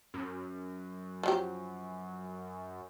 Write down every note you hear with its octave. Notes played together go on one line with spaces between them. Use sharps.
F#2
F3 F#3 G4